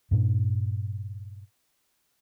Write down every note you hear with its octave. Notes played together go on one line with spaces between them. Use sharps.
G2 A#2 D4